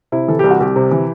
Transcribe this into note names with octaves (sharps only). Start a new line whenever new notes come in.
C3 E4
E3 A4
C2 G4
F#4
C2 G4
C3
E3